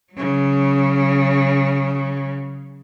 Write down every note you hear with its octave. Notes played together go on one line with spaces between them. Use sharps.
C#3 F#3